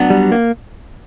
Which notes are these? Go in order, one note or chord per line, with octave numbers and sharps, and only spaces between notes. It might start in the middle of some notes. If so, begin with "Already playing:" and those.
Already playing: F#3 B3 D4
G3
A#3